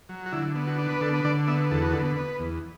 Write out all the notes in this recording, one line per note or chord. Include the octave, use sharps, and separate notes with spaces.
F#3
F#4
D3 E4
B3
F#4
D4
B4
D3 A4
B4
D3 D5
B3 E5
E2 A4
F#4
D3 A4
B4
B3
E2